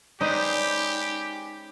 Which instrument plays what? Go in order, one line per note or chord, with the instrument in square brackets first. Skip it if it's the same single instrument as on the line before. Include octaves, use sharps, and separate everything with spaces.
[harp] G#3 D5 D#6 [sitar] C#4 B4 C5 [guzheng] D#4 [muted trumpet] G4